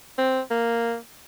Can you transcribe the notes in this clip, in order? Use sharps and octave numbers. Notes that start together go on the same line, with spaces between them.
C4
A#3